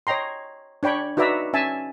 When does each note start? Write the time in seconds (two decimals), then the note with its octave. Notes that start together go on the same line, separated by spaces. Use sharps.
0.07 C#5 D#5 G5 A#5 C6
0.83 D4 C#5 G5 B5 C#6
1.17 D#4 F#4 B4 D5 E5 A#5
1.53 C#4 E5 G#5 A5